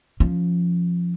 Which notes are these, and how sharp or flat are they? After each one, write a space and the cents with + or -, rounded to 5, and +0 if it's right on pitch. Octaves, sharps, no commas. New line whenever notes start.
F3 +0 C#4 +0